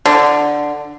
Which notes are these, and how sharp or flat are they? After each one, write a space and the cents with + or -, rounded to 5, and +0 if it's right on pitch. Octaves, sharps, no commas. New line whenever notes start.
D3 +5